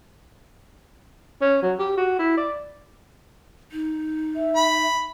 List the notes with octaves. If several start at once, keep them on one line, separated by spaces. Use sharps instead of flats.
C#4
F#3
G4
F#4
E4
D5
D#4
E5
B5